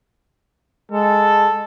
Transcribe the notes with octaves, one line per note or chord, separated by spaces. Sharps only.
G#3 A4